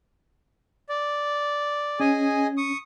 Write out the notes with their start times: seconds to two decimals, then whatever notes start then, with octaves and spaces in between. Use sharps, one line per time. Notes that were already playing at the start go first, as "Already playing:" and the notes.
0.89 D5
2.00 C#4 G#4 D#5 G#5
2.57 C#6 D#6